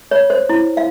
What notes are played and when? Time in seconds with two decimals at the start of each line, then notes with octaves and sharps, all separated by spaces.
0.11 C#5
0.30 C5
0.49 E4
0.77 F5